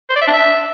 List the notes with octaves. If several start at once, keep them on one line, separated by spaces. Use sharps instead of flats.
C5
D5
E5
D4
E5